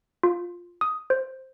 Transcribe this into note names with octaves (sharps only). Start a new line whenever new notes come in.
F4
D#6
C5